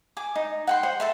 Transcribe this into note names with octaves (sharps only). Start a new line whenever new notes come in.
G#5 D6
D#4
F#5 G5 C6
C5 F#5 C6
A4 E5 C6